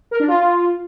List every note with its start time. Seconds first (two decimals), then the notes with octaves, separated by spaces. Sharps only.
0.11 A#4
0.20 D4
0.28 F4